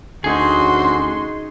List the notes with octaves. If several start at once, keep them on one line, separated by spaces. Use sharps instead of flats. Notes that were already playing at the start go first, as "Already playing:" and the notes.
D2 C#4 D#4 F#4 G#4 C6